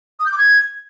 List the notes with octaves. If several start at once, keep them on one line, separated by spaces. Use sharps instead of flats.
D#6
G6
D6
G#6